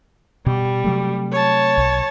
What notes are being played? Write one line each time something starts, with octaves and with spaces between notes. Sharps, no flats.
B2 G3
C3 F#3 A3
C#5 A5
B1